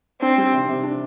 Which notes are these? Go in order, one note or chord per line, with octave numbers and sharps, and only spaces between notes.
C4 D4
G3
C3
C3
D4